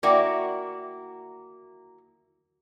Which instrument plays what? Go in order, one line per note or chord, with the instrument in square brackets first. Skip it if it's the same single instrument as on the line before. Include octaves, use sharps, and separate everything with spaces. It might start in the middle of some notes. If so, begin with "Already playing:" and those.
[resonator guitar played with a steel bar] A#3 E4 F#4 [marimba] D5 G5 D6